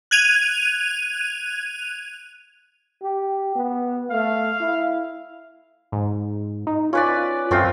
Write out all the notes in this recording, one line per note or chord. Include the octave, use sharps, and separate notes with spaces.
F#6 G#6 D#7 F7
G4
B3
A3 F5
E4
G#2
D#4
C#4 F4 B4 D5
F#2 A3 C4 F4